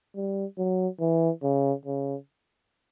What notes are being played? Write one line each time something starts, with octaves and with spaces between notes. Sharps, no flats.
G3
F#3
E3
C#3
C#3